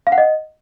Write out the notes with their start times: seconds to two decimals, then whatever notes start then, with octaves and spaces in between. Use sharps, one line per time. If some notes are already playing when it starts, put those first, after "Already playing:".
0.07 F5
0.12 F#5
0.18 D#5